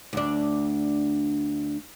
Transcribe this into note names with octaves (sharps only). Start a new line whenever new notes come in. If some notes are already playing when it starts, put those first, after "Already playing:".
D2 D4